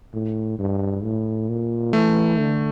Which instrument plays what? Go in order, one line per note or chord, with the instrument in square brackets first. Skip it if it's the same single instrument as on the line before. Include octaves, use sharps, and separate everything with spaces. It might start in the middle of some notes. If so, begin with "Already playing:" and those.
[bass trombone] A2
G2
A2
A#2
[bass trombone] E3 [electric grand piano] A3
[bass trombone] D3